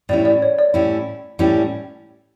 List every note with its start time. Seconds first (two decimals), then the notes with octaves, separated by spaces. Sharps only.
0.09 A2 G3 C#4 E4 D5
0.25 D5
0.42 C#5
0.59 D5
0.74 A2 G3 C#4 E4
1.39 A2 G3 C#4 E4